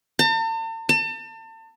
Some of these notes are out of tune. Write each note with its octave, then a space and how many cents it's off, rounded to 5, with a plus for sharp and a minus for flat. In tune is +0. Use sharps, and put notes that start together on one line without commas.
A5 +45
A5 +35